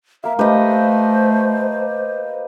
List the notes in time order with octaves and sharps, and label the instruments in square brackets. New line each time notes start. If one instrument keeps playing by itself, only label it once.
[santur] A#3 F5 [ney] E5
[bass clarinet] A3 [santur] G4 [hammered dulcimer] B4 D#5 [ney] C5